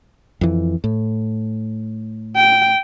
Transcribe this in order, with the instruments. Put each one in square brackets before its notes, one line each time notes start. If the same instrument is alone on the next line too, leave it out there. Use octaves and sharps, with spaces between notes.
[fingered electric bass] F2 E3
A2
[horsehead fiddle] G5